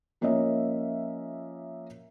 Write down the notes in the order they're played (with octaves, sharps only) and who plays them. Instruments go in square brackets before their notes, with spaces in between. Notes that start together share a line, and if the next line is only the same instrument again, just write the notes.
[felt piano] F3 A#3 C#4 C#5 D#5 E5